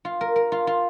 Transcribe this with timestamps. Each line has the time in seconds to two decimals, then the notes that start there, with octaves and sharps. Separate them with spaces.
0.05 F4
0.21 A#4
0.36 A#4
0.52 F4
0.67 F4